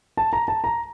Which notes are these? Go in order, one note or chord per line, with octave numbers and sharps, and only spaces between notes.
A5
A#5
A5
A#5